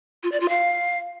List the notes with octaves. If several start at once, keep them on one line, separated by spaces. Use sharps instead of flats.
F4
D5
F4
F5